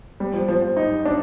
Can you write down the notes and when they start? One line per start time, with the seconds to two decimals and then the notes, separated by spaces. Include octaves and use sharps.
0.20 G3
0.34 F3
0.48 F3
0.62 F3
0.77 D#4
1.05 D4